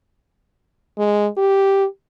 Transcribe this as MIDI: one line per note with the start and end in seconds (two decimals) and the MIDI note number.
0.98 1.28 56
1.37 1.86 67